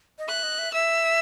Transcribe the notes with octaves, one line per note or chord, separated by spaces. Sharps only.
D#5
E5 F#6
D#5
E5
E5 E6